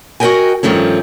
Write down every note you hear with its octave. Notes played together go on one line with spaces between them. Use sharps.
F#4 A#4 B4 D#5 G5 G#5
G2 D#3 F3 A3 C#4